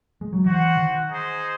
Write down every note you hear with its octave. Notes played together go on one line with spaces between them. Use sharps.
G#3
F#3
E3 F#4 C5 F#5
D#3
D#4 G#4 C5